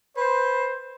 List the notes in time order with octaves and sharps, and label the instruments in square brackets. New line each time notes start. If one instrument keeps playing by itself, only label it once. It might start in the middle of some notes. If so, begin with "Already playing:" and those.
[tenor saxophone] B4 [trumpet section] C5